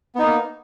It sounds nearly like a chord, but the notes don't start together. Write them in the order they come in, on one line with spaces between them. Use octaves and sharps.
B3 D#4 A#3